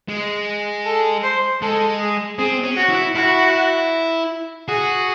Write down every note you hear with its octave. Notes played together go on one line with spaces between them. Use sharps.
G#3
A4
C5
G#3 A4
G#4
C4 G#4
C#4
F#4
E4
E4 F#4
F#4 G#4